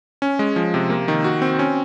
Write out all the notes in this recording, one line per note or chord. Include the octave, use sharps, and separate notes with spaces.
C#4
G#3
F3
C3
A#3
D#3
F#4
C4
C#4